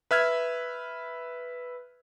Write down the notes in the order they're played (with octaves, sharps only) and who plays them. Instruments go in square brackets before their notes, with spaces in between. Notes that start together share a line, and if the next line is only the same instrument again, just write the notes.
[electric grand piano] B4 E5 F6 G#6